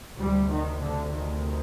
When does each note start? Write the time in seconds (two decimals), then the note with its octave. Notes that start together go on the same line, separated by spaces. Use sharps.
0.16 D2 C3 G3
0.48 D#3
0.80 D3
1.12 D#3